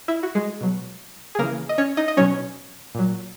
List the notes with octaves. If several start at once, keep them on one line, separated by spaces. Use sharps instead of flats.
E4 E5
F#4
G#3 G#4
B2 F#3
G#4
C#3 E3 A#3 A#4
D#5
C#4 C#5
D#4 D#5
D#5
B2 F#3 C#4 C#5
A#2 F#3